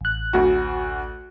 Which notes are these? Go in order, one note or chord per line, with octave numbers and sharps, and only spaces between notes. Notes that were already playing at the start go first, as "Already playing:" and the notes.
A1 F#6
D2 F#4